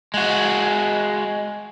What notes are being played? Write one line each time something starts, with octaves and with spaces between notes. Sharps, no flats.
G#3 F#4